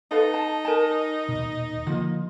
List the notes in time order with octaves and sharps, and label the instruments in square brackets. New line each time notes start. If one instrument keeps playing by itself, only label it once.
[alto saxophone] D#4 [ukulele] A4 B4 F5
[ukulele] A5
A#4 G#5 A5
[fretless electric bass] D#1 B2
[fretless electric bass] D3 F3 A#3 [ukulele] F4